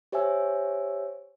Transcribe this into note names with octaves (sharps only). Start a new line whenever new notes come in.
G4 C5 C#5 E5 G#5 E6